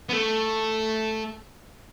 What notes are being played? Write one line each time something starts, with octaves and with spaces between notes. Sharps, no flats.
B3
A3